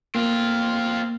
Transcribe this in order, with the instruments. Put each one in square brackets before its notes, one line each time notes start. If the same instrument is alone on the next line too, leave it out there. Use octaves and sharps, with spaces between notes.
[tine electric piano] A#3 [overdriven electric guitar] C4 F4